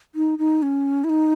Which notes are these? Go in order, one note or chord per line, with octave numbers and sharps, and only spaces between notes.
D#4
D#4
C#4
E4
D#4